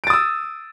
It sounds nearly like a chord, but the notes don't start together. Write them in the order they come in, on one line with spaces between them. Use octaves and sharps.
D7 A6 D#6 E6